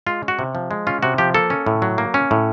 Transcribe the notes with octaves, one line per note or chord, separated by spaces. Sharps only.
G#3 F4
C#4
F#4
C3
F3
G#3
C#4 F4
C3 F#4
F3 G4
A#3 A4
C#4
A2
F#3
A#3
C#4
A2